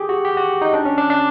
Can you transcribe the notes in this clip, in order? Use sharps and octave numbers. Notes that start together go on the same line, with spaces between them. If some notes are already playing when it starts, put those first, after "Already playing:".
Already playing: G4 G#4
F#4
G4
F#4
D#4
D4
C#4
D4
D4